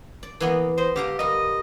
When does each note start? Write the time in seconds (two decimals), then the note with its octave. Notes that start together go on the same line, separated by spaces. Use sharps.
0.23 D5
0.40 E3 A#3 B3 D#5
0.78 C5 D#5
0.96 D3 G4 F5 A#5
1.19 G3 A#4 D#5